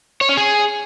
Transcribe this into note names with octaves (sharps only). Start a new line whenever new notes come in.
C#5
C#4
G#4